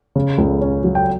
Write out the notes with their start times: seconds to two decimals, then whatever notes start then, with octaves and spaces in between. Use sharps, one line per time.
0.16 C#3
0.38 C#2
0.61 C#4
0.84 F#3
0.95 G5